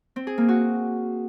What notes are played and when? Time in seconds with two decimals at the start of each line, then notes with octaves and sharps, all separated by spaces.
0.16 C4
0.27 G#4
0.38 A#3
0.48 F#4